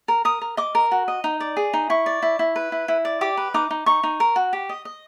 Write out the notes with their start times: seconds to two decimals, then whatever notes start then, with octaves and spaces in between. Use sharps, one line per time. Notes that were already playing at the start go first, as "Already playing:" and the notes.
0.08 A#4
0.25 A#4 D#6
0.41 A#4
0.57 D#5 D6
0.75 A#4
0.91 F#4
1.08 D#5
1.24 D#4
1.40 D5
1.57 G#4
1.73 D#4
1.90 E4 C#6
2.06 D5
2.22 E4
2.39 E4
2.56 B4
2.72 E4
2.88 E4
3.05 D5
3.21 G4 D6
3.37 B4
3.54 D#4 D6
3.70 D#4
3.86 D#4 C#6
4.03 D#4
4.20 A#4
4.36 F#4
4.53 G4
4.69 D#5
4.85 D#5